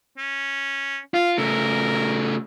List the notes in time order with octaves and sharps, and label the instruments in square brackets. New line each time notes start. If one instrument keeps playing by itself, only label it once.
[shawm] C#4
[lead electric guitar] F4 [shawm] F5
[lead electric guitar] C#3 A3 [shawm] A#4